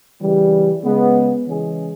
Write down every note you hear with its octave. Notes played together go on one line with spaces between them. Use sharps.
C#3 E3 G3
C#3 G#3 B3
C#3 E3 G#3 C#4 G#4